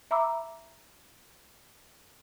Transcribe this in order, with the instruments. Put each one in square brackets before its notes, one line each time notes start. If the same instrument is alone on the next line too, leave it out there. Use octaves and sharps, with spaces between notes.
[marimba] E5 A#5 B5 D6 E6